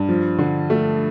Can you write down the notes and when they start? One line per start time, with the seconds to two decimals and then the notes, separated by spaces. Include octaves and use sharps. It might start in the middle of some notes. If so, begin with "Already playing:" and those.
Already playing: G2
0.09 F3
0.39 D3
0.70 A3